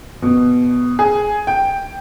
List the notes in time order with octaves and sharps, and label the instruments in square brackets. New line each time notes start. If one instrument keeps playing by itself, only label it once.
[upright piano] B2
G#4
G5